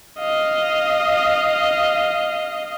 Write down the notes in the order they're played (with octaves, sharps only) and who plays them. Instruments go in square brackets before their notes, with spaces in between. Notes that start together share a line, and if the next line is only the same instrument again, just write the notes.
[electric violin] D#5 F5